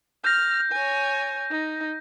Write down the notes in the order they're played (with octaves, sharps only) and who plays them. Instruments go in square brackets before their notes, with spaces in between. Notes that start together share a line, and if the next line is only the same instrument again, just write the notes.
[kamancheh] F6 [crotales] G6 A#6
[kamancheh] C#5 G#5
D#4